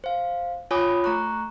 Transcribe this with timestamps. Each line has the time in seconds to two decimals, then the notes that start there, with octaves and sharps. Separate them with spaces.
0.04 C5 F5
0.71 F4 C#5 G#5 B5 D6 D#6
1.04 A3 A#5 C#6 F#6